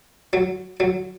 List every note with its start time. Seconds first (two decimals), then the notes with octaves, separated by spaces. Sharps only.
0.33 F#3
0.80 F#3